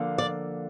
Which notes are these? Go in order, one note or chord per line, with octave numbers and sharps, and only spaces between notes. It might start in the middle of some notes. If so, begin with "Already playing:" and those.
Already playing: D3 F3 A#3
D5